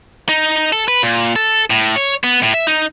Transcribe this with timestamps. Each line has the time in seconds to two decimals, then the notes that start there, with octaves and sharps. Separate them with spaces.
0.29 D#4
0.73 A4
0.88 B4
1.03 A#2
1.36 A4
1.70 A2
1.96 C#5
2.24 B3
2.43 A2
2.54 E5
2.67 D#4